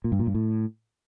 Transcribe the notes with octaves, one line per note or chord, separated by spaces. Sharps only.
A#2
G2
A#2
G2
A2